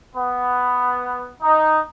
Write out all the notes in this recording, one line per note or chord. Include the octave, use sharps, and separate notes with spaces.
B3
D#4